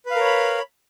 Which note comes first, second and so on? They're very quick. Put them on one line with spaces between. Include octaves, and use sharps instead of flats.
B4 F5 A#4 C#5 B5